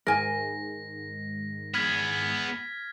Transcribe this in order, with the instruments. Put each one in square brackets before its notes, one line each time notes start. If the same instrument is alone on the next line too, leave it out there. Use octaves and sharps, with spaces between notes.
[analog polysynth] G#2 D#3 [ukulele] A#4 G#5 [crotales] A#6
[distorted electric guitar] B3 G#4 [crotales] F6 G#6 B6